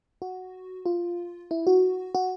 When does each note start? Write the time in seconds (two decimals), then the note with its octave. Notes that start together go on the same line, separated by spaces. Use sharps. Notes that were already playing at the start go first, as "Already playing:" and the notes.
0.22 F#4
0.86 F4
1.51 E4
1.67 F#4
2.15 F#4